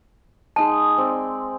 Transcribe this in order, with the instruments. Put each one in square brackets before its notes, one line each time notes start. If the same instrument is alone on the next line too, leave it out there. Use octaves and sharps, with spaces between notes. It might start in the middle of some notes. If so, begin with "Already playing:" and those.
[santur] G#3 D#4 D#6 [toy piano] A5
[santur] C4 D5